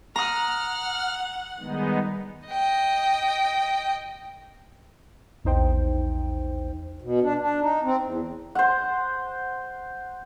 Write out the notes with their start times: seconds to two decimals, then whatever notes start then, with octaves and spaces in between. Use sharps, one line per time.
0.16 F#5 A#5 D#6 F6
1.58 D#3 G3 G#3 B3 D#4
2.48 D#5 G5
5.44 A#1 E2 D#4 C5 G5
7.02 B2
7.22 D4
7.39 D4
7.61 D#4
7.84 C4
8.01 E2
8.55 C5 F#5